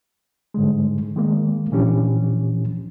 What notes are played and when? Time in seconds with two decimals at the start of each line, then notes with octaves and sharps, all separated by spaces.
0.54 G#2 D3 G3 G#3
1.16 D#3 G#3 A#3
1.72 A#2 E3 F3 C#4 D4 G4